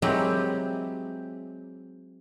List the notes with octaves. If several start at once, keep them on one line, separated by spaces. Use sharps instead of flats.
F#3 G#3 C4 D#4 E4 G4